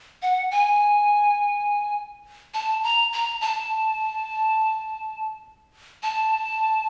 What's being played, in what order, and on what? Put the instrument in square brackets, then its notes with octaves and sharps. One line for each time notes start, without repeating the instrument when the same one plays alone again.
[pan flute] F#5
G#5
A5
A#5
A#5
A5
A5